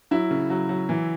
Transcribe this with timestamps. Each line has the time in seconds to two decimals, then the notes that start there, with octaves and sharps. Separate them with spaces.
0.11 F#3 E4
0.31 C#3
0.50 F#3
0.69 F#3
0.89 E3